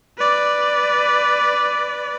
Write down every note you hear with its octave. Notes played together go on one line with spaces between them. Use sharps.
B4 D5